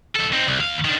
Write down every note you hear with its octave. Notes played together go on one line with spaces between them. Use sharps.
D#2 A4
C4 D#4
C2
D#2 F5
D#3 D4